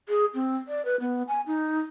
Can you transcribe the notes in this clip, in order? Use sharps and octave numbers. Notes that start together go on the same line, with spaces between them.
G#4
C4
D5
B4
B3
G#5
D#4